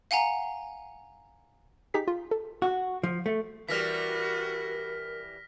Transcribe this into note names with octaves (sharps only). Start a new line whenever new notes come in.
F5 F#5 G#5 A#5
D#4 G4 G#4 B6
F4
A4
F#4
F3
A3
E3 G3 F#4 A#4 F6 A#6 B6